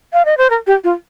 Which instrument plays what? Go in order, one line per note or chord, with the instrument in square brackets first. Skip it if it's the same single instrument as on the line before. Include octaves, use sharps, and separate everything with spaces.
[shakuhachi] F5
D#5
C5
A#4
G4
F4